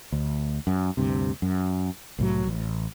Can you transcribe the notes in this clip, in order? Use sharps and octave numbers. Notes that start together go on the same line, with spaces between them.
D2
F#2
D2 G2 C3
F#2
C2 A2 F#3
A1